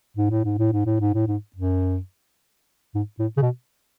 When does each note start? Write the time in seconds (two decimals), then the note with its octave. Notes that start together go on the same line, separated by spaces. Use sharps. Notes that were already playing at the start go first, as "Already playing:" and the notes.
0.17 G#2
0.30 A2
0.44 G#2
0.59 A2
0.72 G#2
0.86 A2
1.00 G#2
1.14 A2
1.28 G#2
1.56 F#2
2.95 G#2
3.19 A2
3.37 C#3
3.42 B2